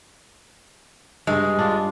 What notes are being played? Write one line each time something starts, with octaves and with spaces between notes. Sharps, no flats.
G2 G#3
D4 F4